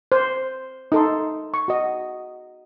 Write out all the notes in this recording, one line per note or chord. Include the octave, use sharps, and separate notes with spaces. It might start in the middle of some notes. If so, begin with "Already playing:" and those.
C5
D#4 A4 C6
C#6
F#4 D#5